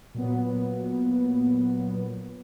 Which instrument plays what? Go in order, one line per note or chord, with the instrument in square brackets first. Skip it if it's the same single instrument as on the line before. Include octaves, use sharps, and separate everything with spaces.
[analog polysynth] A#2 F#3 B3